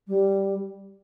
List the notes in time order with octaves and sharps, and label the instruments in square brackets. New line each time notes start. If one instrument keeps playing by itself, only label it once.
[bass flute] G3